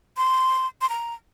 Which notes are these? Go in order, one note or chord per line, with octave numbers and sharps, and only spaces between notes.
C6
C6
A#5